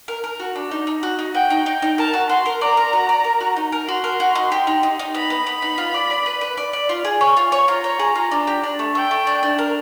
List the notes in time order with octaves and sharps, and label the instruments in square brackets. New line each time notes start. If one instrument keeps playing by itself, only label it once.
[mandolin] A#4
A#4
F#4
D4
D#4
D#4
F#4
D#4
[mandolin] F#4 [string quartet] G5
[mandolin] D#4
D#4
D#4
[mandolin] A#4 [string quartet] A5
[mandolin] F#4
[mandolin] F#4 [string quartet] C6
[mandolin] A#4
[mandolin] D5 [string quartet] A#5
[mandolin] A#4
F#4
D5
A#4
F#4
D#4
A#4
[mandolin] F#4 [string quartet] C6
[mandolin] A#4
F#4
D#4
G4
D#4
D#4
D#4
[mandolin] B3 [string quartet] B5
[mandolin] B3
B3
D#4
F4
D5
D5
B4
B4
D5
D5
F4
G#4
C#5
F4
C#5
[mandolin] F4 [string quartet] A#5
[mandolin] C#5
G#4
F4
D4
G4
D4
A3
[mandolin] A3 [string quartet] G5
[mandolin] A3
D4
D4
A#4